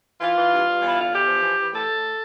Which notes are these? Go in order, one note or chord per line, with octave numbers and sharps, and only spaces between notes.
E3 F4
E3
G2
G2
E2 E4
D3 F4
E2 G4
F3
E3
E3
A2 A4
A2